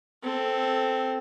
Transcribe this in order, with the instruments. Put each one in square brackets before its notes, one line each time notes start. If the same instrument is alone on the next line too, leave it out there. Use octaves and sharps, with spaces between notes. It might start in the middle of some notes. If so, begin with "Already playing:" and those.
[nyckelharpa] C4 A4